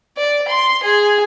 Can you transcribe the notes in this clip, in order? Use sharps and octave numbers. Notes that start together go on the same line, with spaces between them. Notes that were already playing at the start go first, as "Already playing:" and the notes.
D5
C6
G#4